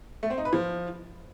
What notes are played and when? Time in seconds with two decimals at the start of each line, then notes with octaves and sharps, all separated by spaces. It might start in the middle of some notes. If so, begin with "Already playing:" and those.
0.23 A3
0.30 C4
0.38 D#4
0.45 B4
0.53 F3